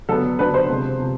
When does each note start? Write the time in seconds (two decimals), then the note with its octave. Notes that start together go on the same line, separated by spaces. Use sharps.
0.09 D3 F#3 B3 D4 A4
0.39 D3 F#3 B3 D4 B4
0.54 C5
0.69 C3 F3 G#3
0.99 C3 F3